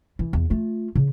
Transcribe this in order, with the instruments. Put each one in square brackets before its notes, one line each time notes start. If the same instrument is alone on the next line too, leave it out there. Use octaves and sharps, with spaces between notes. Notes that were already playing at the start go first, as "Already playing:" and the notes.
[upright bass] E3
E2
A3 F4
C#3